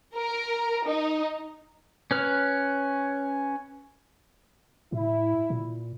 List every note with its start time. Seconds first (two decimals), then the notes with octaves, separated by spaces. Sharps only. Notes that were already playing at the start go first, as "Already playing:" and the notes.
0.15 A#4
0.88 D#4
2.11 C#4 B4 F6
4.92 A2 E4
5.50 A#2